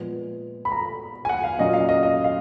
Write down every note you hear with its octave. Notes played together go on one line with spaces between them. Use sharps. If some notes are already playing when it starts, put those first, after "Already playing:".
Already playing: A#2 F3 G#3 B3
B5
A#5
G#5
F#5
F5
A#2 F#3 C#4 D#5
F5
D#5
D#5
F5